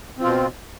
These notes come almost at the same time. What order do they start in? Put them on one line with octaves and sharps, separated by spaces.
C4 F4 B2